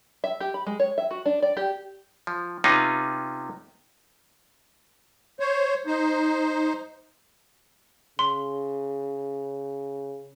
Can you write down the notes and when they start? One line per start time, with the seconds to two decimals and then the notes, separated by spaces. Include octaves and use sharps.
0.24 E5
0.40 G4
0.54 B5
0.67 G#3
0.80 C#5
0.98 E5
1.11 F#4
1.26 D4
1.42 D5
1.57 G4
2.27 F3
2.64 C3 B3 C#4 D#4 F4
5.40 C5 C#5
5.87 D#4 C5
8.19 C#3 C6